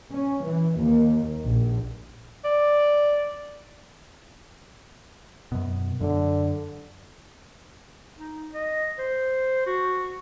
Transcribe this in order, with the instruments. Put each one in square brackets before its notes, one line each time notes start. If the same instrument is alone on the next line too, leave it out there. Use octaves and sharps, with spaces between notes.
[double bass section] C#4
E3
D#2
A#1
[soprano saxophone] D5
[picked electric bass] F#2 B2
[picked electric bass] F#2 [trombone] D3
[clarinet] D#4
D#5
C5
F#4